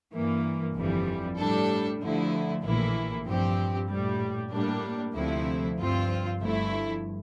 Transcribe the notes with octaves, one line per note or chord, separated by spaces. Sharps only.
G2 E3 A#3
G1 F2 E3 G3
A2 G3 D4 A4
D2 D3 F3 A3 E4
A#1 A2 E3 A#3 E4
G2 F3 C4 G4
A#1 A2 G3
A2 G3 A#3 D4
D2 C3 F3 A3 E4
G2 F3 C4 F4
G1 G2 F3 A3 E4